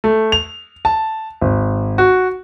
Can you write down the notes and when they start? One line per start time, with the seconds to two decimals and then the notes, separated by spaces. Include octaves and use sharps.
0.04 A3
0.32 F7
0.85 A5
1.41 G#1
1.98 F#4